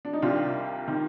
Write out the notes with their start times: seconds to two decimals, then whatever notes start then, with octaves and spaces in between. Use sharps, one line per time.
0.05 D4
0.13 D#4
0.22 C2 C3 D#3 D4 F4
0.87 C3 D#3